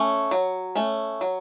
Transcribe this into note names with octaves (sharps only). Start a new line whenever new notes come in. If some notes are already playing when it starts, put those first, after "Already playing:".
Already playing: A3 C#4
F#3
A3 C#4
F#3